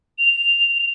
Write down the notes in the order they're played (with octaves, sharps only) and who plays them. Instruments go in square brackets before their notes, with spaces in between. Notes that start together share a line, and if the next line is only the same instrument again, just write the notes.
[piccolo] F7